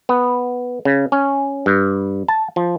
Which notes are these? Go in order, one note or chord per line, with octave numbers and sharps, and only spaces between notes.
B3
C#3
C#4
G2
A5
F3